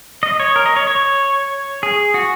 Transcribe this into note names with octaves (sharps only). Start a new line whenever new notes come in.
D#5
C#5
A#4
D#5
C#5
C#5
G#4
F#4